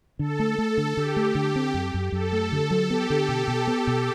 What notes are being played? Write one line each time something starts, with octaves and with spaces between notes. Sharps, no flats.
D3 A4
A3
A3
D3
D3 G4
A3
D3
C4
F#2
F#2
F#2 A4
A3
D3
F#3
B3 G4
D3
B2
B2
B3
B2